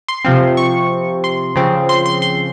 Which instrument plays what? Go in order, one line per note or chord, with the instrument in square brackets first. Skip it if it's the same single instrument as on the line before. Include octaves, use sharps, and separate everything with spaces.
[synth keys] C6
C3 F3 C4
C#6
C6
C#3 F3 C4
C6
C6
C6